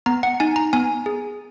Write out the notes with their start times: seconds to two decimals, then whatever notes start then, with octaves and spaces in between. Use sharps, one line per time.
0.06 B3 A#5
0.23 F#5
0.40 D#4 G#5
0.56 A#5
0.73 B3 G#5
1.06 G#4